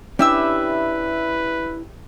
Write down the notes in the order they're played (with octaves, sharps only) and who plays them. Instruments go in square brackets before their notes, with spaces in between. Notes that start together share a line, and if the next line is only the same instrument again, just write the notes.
[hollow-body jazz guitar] C#4 D4 E4 [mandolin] G4 E5 E6 [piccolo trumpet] B4